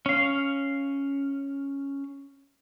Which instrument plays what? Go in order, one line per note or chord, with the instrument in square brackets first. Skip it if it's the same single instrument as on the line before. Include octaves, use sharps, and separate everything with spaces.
[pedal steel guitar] C#4 F5